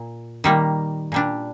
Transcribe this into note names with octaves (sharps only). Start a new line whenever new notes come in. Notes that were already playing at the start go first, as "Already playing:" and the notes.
Already playing: A#2
D#3 G3 A#3
A#2 G3 D4